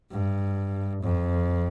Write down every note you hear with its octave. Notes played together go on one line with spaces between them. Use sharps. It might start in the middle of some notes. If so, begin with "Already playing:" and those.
G2
F2